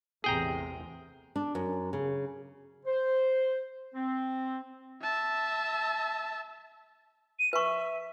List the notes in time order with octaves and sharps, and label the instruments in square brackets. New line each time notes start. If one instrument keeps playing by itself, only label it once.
[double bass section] A1 E2 C3 [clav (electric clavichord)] G#4 G5 A#5
[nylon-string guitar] D4
F#2
C#3
[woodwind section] C5
C4
[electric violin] E5 A5
[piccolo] D#7
[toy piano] B4 C#6 [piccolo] E5